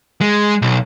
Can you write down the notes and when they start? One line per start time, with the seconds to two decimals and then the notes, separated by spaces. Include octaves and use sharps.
0.21 G#3
0.62 B1